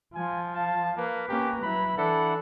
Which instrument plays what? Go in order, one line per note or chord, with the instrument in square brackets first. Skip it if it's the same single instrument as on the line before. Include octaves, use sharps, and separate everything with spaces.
[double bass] F3 [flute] F4 [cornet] G#5
[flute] F5 [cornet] A5
[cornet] A#3 [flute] B4
[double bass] A#3 C#4 [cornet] G4 [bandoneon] A#5
[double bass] F#3 E4 [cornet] B5
[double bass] E3 [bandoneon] D4 E4 F#5 [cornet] A4